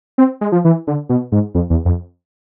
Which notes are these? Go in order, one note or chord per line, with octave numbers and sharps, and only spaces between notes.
C4
G#3
F3
E3
D3
B2
G#2
F2
E2
F2